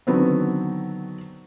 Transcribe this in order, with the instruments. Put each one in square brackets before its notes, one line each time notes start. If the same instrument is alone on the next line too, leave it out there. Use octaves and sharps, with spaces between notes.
[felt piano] D3 D#3 F#3 B3 C4